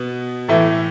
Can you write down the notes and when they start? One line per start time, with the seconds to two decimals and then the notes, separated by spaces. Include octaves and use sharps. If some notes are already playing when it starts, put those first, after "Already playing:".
Already playing: B2 B3
0.48 A2 E3 A3 E4